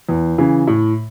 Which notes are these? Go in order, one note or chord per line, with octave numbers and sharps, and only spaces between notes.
E2
C#3 E3
A2